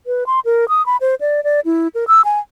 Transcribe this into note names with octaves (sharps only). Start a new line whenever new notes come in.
B4
C6
A#4
D#6
B5
C5
D5
D5
E4
A#4
E6
G#5